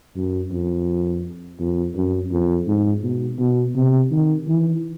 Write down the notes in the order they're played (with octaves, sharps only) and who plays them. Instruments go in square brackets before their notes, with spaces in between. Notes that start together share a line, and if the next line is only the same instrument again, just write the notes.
[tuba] F#2
F2
F2
F#2
F2
G#2
B2
B2
C3
D#3
E3